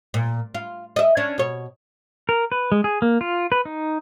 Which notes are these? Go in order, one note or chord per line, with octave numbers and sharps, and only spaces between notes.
A#2
F4
D#5 E5
C#4 D4
B2 C#5
A#4
B4
G#3
G#4
A#3
F4
B4
D#4